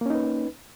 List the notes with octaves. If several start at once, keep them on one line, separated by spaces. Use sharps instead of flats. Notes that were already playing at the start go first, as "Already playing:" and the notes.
A#3 C#4 D#4 B4